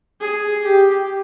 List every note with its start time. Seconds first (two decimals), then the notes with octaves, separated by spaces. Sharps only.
0.21 G#4
0.63 G4